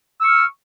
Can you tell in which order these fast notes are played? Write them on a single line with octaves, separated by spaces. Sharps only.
E6 C#6 F6